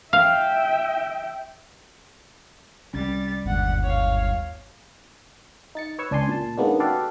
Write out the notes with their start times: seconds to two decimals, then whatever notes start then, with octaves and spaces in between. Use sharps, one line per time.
0.13 E5 F5 G5
2.94 C2 G3 C#4 A6
3.46 G1 D#2 G#2 G3 F#5
3.84 C#5 F5
5.75 D#4 A6 C#7
5.99 B4 C#5 C#6 E6
6.11 C#2 D4 D5 G#5 C6
6.29 A#2 A5
6.58 D#3 G#3 A#3 B3 C#4 D4
6.80 F#4 G4 A4 B4 D5 F5